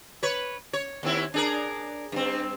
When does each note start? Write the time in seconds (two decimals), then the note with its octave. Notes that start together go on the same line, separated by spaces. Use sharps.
0.23 B4 C#5
0.73 C#5
1.03 D#2 C4 E4
1.34 D4 G#4 A#4
2.12 G2 C4